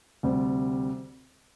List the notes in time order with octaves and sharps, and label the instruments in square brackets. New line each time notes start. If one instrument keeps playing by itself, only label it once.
[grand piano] D2 C3 G3 C4